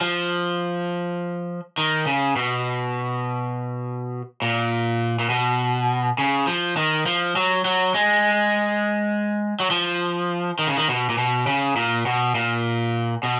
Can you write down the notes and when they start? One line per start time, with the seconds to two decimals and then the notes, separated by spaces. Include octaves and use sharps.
0.01 F3
1.78 D#3
2.07 C#3
2.36 B2
4.42 A#2
5.19 A#2
5.30 B2
6.18 C#3
6.47 F3
6.77 D#3
7.06 F3
7.36 F#3
7.65 F#3
7.95 G#3
9.60 F#3
9.71 F3
10.59 D#3
10.68 C#3
10.77 D#3
10.89 B2
11.09 A#2
11.18 B2
11.47 C#3
11.76 A#2
12.06 B2
12.35 A#2
13.23 B2